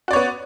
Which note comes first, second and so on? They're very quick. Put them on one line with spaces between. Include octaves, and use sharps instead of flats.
F#4 D5 C#5 B3